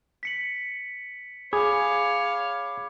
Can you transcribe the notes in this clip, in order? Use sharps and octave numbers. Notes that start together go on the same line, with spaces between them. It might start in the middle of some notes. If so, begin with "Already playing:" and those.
B6 C#7 F#7
G#4 C#5 F5 B5 D6 G#6